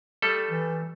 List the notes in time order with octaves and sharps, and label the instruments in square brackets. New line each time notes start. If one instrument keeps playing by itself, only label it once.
[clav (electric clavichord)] G3 A3 A4
[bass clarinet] E3